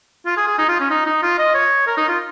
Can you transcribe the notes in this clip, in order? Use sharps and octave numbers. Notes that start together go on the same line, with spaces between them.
F4
G#4
G#4
D#4
F4
C#4
D#4
D#4
F4
D#5
C#5
A#4
D#4
F4